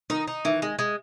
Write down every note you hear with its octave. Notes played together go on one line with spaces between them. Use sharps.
D#3 D#4
D#4
D#3 E3
G#3
G#3